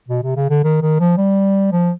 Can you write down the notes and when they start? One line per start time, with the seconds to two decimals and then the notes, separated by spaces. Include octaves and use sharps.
0.09 B2
0.23 C3
0.37 C#3
0.50 D3
0.64 D#3
0.82 D#3
1.00 F3
1.17 G3
1.72 F3